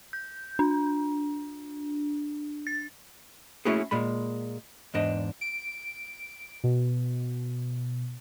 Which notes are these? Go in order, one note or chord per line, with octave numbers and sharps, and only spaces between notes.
G6
D4
A6
A3 A#3 C#4 E4 F#4 G#4
A#2 G#3 B5
E2 G#2 D4 D#5
D7
B2